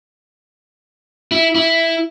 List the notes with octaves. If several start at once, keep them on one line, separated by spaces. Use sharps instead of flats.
E4
E4